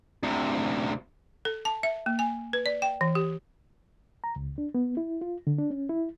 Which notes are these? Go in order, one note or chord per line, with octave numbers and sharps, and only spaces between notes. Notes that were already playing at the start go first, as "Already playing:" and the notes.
D2 C3
A4
A5
E5
A#3
G#5
B4
D5
G5
E3
G4
A#5
C#2
D4
B3
E4
F4
D3
D4
C#4
E4